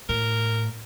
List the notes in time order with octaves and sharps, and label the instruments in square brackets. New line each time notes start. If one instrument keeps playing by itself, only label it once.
[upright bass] A2 [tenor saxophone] A#4